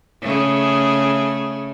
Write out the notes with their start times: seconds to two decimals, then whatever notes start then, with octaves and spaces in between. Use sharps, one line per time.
0.22 C#3 A3 G#4